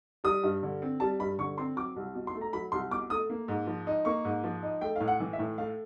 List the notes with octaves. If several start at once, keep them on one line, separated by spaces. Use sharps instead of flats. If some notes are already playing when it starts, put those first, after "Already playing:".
G3 D#6
G2
D3
C4
G3 A5
G2 B5
D3 C#6
C4 C6
F#3 D6
C2
B2
C6
A3
A#5
F#3 B5
C2 C6
B2 D6
A3 D#6
A#3
G#2
F3
D#4
A#3 C#6
G#2
F3
D#4
A3 G5
A2 F5
F#5
E3
E5
A2
A3 F5